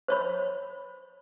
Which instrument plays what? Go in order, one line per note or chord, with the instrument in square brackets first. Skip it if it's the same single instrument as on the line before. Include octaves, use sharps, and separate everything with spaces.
[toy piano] C5 C#5 B5